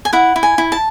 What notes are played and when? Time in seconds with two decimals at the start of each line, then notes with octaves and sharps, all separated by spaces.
0.05 G#5
0.13 E4 F#5
0.36 E4
0.43 G#5
0.58 E4
0.72 A5